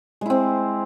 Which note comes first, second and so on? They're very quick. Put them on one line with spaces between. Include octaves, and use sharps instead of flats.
G#3 E4 C4